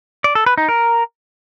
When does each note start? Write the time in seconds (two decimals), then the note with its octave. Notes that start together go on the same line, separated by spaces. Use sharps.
0.24 D5
0.35 A4
0.46 B4
0.58 D#4
0.69 A#4